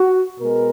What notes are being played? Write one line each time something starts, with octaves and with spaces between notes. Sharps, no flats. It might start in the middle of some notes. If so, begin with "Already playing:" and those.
Already playing: F#4
B2 G#3 A#4